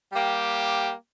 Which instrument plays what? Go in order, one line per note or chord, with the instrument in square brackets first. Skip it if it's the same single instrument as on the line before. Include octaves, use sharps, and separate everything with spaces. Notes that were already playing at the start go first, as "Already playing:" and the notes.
[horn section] G3 A#3 G4